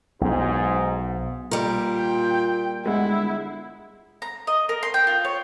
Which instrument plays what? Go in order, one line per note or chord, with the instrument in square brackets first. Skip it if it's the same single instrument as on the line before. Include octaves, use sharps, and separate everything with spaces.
[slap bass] B1 [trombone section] G#2
[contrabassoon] A#2 [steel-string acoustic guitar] G3 A#4
[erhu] G5
[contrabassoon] G1 [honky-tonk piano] G#3 F#5 [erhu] E4
[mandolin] A#5
D#5
A#4
C6
G5
F4
C#5